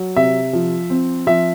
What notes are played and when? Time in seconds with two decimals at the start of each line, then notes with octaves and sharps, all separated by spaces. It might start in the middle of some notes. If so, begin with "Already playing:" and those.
Already playing: F#3
0.16 C3 E5
0.53 F3
0.90 C4
1.27 F3 E5